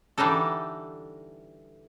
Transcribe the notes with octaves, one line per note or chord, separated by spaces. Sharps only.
D3 E3 G3 D4 D#4 A4